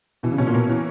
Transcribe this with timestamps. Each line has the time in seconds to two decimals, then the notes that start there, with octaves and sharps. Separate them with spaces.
0.23 B2 E3
0.32 C#3
0.38 B2 C#4
0.47 A#2
0.54 B2 A#3
0.69 E3